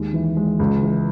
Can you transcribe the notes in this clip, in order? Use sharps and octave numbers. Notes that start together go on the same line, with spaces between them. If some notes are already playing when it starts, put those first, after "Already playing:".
Already playing: D#2 G#3
E3
G#3
C#2
E3